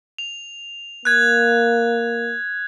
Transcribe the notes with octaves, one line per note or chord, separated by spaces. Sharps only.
F7
A#3 F#6 G#6